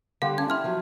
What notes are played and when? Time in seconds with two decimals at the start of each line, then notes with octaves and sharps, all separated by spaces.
0.22 D3 G3 D4 G4 F5 F#5 C6
0.38 C#4 G#5 A5 G#6
0.50 E4 E5 C6 F6
0.64 F3 F#3